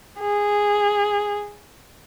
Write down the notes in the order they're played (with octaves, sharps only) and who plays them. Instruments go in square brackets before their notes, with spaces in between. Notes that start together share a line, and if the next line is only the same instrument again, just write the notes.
[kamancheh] G#4